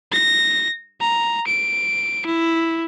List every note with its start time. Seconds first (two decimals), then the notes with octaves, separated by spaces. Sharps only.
0.12 A#6
1.01 A#5
1.47 D7
2.26 E4